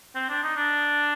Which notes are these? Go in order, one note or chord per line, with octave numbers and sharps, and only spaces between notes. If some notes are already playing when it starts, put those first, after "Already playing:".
C4
D4
D#4
D4